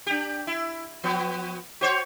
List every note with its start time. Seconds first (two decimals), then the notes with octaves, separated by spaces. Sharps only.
0.07 D4 G4
0.47 E4
1.04 F3 B3 F#4
1.81 F#4 C5 C#5